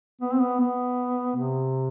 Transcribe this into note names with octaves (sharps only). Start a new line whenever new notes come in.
B3
C4
B3
B3
C3